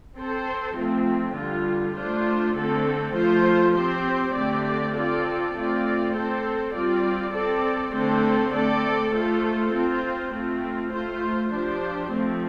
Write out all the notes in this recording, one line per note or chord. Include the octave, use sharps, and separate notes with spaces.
C4 A4 C5
F3 A3 C4
D3 G3 F4
A3 D4 F4 C5
D3 A3 C4 A4
F3 A3 F4 C5
C4 G4 C5
D3 A3 C4 G4 D5
C4 F4 A4 D5
A3 C4 F4 D5
C4 A4 C5
G3 C4 F4 D5
C4 A4 D5
D3 A3 C4 A4 C5
A3 C4 A4 D5
A3 F4 A4 C5
C4 F4 C5
A3 C4 F4
A3 F4 C5
F3 D4 G4 C5
F3 A3 C4